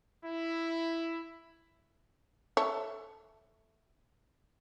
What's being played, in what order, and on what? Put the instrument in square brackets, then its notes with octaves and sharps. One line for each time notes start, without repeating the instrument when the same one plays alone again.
[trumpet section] E4
[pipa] A4 E5 A5 [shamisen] C#5